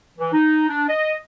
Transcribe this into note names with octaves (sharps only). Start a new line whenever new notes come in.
E3
D#4
D4
D#5